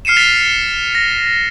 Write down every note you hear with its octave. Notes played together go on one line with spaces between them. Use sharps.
F6 C7 C#7 D#7 E7
A6 B6 C7 F7
A#6